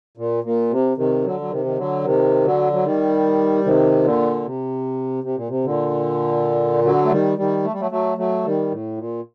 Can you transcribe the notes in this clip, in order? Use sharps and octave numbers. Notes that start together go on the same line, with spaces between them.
A#2
A#2
C3
C3 D#3
D3 F#3
F#3
C3 D#3
D#3
D3 F#3
C3 D#3
D3 F#3
F#3
D#3 G3
C3 D#3
A#2 D3
C3
C3
A#2
C3
A#2 D3
D3 F#3
A3
D#3 G3
D#3 G3
A3
G3
F#3 A3
F#3 A3
F#3 A3
D#3 G3
A2
A#2